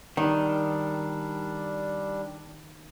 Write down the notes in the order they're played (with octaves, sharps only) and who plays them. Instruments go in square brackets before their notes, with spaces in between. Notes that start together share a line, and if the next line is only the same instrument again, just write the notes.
[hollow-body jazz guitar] D#3 [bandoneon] G3 D4